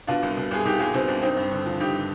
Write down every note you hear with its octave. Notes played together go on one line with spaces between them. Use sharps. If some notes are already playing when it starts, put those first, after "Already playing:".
B2 D4 F4
C2
B2
C2 G#4
B2 D#4 G4
C2 F4 G#4
B2 C4 D#4
C2 D4
G2 C4 D#4
G2
D3
F3
G2 D#4 G4